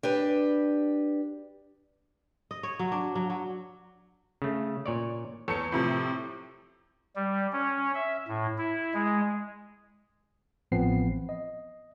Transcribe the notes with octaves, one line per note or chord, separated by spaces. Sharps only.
D4 G4 B4
D#5
C#5
F#3
D4
F#3
F#3
C#3 A3
A#2 C#5 D5
E2 A4 C#5 C#7
A2 C3 F3
G3
C#4
E5
A2
E4
G#3
A1 A2 F3 B3 C4 C7
D#5